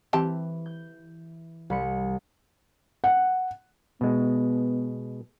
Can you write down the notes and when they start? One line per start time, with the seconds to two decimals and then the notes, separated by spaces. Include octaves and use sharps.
0.13 E3 C4 G4 A5
0.66 G6
1.70 C2 B5 C#7
3.04 F#5
4.01 B2 G#3 B3